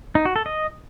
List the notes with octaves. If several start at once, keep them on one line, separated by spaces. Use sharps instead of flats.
D#4
F#4
A4
D#5